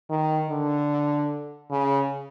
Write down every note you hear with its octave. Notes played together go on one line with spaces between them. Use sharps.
D#3
D3
C#3